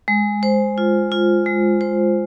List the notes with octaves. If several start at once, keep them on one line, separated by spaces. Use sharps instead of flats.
G#3
C5
F4
F4
G#3
C5